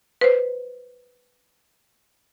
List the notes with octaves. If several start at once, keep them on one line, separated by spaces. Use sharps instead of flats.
B4 C5